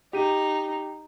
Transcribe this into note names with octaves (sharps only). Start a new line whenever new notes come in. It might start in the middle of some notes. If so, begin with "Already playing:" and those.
D#4 G4 D#7